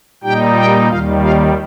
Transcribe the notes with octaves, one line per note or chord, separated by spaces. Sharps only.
A#2 G3 D#4 G4 G5
G4 G5
D#2 D#3 G3 F4 F5
F4 F5